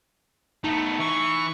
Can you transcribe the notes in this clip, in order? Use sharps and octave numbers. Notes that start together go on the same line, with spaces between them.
A3 B3 D#4
E3 C#6